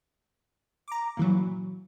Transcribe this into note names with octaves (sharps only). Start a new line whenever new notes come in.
A#5 D6
A#2 E3 F#3